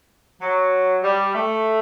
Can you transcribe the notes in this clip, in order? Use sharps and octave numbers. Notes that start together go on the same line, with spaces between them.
F#3
G3
A3